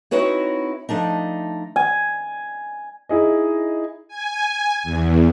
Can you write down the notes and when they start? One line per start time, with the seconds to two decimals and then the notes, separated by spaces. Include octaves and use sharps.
0.11 C4 D#4 E4 F#4 B4 C#5
0.89 F3 A3 D4 D#4
1.76 G#5
3.09 D#4 E4 G#4 D#5
4.08 G#5
4.83 E2